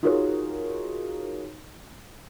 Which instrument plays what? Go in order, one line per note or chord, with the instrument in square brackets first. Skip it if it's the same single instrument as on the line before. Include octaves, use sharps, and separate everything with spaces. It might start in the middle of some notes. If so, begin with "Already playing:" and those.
[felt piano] D#4 F4 F#4 G#4 A#4 C#5